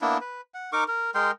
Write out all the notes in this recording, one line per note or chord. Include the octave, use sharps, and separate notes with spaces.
A#3 B3 D4 E4
B4
F#5
D#4 A#4 C#6 D6
A#4
G#3 A#4 G5 C6